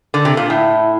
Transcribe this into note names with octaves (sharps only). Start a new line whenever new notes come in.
D3
C3
A#2
A2 E4